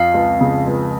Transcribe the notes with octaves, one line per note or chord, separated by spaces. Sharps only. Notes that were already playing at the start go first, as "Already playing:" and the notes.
Already playing: F2 F4 F5
C#2
C#3
C#2